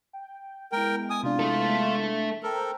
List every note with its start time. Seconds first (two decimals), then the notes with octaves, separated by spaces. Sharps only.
0.13 G5
0.72 G#3 B3 E4 A#4 G5
1.10 G#5 D#6
1.23 C3 D4 F4
1.39 A3 A4
2.43 A4 A#4 C5 G5 A#5